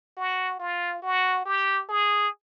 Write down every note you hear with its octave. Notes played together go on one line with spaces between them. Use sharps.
F#4
F4
F#4
G4
G#4